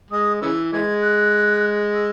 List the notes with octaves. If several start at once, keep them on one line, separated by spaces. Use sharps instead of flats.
G#3 D#6
C#3 E3 E6
E3 G#3 G#6
F#6
E6